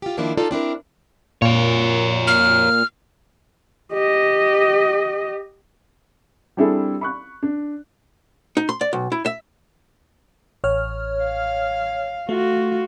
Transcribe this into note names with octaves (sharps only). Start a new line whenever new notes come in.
F4 G4
D#3 F3 A#3 C4 D4 E4
D#4 F4 A4 D5
C4 D4 E4 A#4
A#2 A#4 C#5
F6
G4 D#5
G3 C4 D4 E4 G#4 A4
B5 C#6 F#6
D4
D#4
C6
D5
B1
E4
E5
A1 C#5 F6
F5
A3 F4 F#4